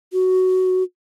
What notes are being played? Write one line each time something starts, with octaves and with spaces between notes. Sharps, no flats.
F#4